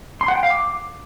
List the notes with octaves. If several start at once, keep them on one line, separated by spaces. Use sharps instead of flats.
C6
F#5
G5
F5
D6